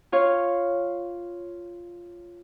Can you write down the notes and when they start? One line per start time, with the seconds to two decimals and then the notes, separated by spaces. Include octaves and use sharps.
0.12 F4 C#5 F5